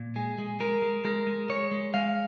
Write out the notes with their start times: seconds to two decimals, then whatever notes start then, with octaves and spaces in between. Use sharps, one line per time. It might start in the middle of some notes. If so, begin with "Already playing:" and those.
Already playing: A#2
0.16 G#3 G#4
0.38 G#3
0.60 G#3 A#4
0.82 G#3
1.05 G#3 A#4
1.27 G#3
1.49 G#3 C#5
1.71 G#3
1.94 G#3 F5